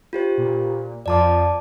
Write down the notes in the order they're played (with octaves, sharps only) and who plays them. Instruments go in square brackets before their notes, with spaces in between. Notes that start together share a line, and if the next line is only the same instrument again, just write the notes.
[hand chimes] F4 G4 C5
[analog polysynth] A#2
[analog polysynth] F2 F3 [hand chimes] D5 A5 D6